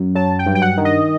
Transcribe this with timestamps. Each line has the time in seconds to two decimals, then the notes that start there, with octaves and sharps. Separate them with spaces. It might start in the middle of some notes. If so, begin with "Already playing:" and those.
Already playing: F#2
0.15 F#3 A5
0.39 G5
0.46 G2
0.55 G5
0.62 F#5
0.78 D#3
0.85 D#5